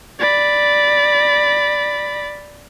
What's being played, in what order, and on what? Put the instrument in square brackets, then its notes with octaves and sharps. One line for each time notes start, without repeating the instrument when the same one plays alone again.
[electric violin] D5 B5